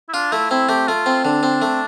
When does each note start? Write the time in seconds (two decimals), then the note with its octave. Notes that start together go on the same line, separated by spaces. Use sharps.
0.09 E4
0.14 D4 F4
0.32 A3 E4
0.51 C4 E4
0.69 A3 G4
0.88 A3 F4
1.06 C4
1.24 D3 D4
1.43 C4
1.62 A3